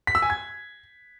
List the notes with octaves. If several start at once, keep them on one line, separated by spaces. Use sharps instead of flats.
B6
E6
G#5
G#6